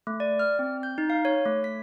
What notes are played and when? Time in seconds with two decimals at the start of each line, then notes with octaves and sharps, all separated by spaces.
0.07 A3
0.20 D5
0.39 F6
0.59 C4
0.83 G6
0.98 D#4
1.10 F5
1.25 C#5
1.45 A3
1.64 B6